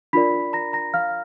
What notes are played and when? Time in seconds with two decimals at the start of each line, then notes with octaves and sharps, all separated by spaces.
0.13 D4 F4 A#4 D5 B5 B6
0.53 A#5 A#6
0.73 A#5 A#6
0.94 F5 F6